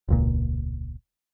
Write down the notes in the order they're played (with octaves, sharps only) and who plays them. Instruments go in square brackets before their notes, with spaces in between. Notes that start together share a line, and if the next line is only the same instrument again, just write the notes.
[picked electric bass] E1 C#2 A#2